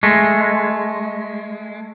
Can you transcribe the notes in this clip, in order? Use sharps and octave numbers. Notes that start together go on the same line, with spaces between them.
G#3 A3